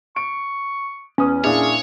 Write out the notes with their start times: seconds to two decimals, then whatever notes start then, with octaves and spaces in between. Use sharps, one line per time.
0.16 C#6 D7
1.18 E2 C#4 B4 D#6
1.44 A#2 D4 E4 G#4 C#5